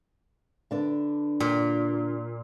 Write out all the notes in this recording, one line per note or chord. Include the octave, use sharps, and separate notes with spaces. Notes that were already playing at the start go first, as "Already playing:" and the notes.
D3 D4 B4
A#2